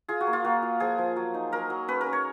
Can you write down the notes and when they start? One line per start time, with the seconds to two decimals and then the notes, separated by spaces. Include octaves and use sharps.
0.08 F4 G#4
0.21 F#4
0.27 A#3
0.33 F4
0.44 A#3 F#4
0.62 F4
0.80 F3 G#4
0.98 F3
1.16 F#3
1.34 D#4
1.52 F#3 A#4
1.70 F#3
1.88 C#4 B4
2.01 A#4
2.06 C#4
2.13 C#5